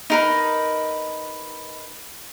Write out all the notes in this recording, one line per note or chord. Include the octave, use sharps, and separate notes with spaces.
D#4 A#4 B4